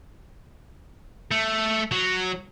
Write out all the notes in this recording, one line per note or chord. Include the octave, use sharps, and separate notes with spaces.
A3
F#3